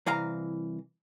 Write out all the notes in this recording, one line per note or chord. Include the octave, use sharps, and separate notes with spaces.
C2 E3 F5 A#5